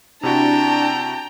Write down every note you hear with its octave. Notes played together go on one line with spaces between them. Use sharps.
C3 D4 E4 F#4 G5 A5 A#5